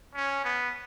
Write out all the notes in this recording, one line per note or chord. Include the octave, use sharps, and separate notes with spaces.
C#4
B3